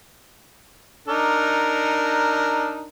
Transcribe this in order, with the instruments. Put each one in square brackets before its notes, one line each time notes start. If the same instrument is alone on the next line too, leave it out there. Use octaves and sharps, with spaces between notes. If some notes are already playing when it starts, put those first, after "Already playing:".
[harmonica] D4 D#4 A#4